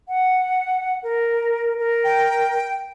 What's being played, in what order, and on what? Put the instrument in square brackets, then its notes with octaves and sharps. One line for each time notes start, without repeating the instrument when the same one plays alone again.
[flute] F#5
A#4
A#4
[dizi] G5